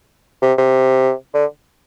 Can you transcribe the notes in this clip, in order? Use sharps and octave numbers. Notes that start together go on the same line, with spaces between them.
C3
C3
D3